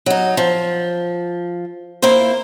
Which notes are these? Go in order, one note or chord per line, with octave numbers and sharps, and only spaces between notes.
F#3 D#4
F3
A#3 E4 F4 C5